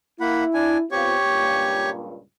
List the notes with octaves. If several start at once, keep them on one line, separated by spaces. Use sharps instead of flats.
A#3 E4 F#5 B5
D4 G#5
B3 C4 F4 G4 C#5 C#6
C#2 G2 A#2